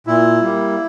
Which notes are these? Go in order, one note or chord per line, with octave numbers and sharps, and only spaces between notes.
A#2 E4
G3 A#3